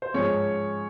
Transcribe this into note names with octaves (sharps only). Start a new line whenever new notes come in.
C5
G#2 F3 G#3 C#4 C#5